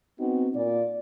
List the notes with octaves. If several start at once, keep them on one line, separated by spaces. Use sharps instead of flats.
B3 C4 D#4 F#4
A#2 D5